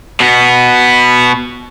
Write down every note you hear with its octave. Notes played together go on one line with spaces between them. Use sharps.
B2 B3